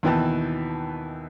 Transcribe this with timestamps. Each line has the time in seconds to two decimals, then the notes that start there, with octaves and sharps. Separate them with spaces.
0.03 D#2 B2 E3 B4 G5 A5